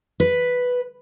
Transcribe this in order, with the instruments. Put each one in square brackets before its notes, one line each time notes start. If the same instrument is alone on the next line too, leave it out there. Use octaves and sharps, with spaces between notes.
[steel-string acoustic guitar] B4